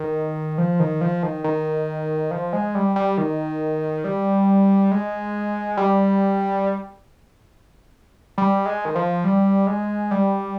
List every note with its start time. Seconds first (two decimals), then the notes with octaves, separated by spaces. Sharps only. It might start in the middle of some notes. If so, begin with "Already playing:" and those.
Already playing: D#3
0.58 F3
0.80 D#3
1.01 F3
1.23 D#3
1.44 D#3
2.31 F3
2.53 G#3
2.75 G3
2.96 G3
3.18 D#3
4.04 G3
4.91 G#3
5.77 G3
8.38 G3
8.66 G#3
8.85 D#3
8.95 F3
9.24 G3
9.67 G#3
10.11 G3